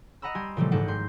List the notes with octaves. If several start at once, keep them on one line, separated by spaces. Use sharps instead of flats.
D#5 F#5 A#5 B5 E6
G3 G4 G#5 C6 G#6
A#2 C#3 E3 F3 G3 A3
G#1 G#2 D#4 G4 A4 F#5
G#2 C6 G6